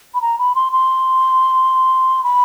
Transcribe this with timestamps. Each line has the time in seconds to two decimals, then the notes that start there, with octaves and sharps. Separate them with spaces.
0.14 B5
0.22 A#5
0.39 B5
0.55 C6
0.72 C6
2.24 B5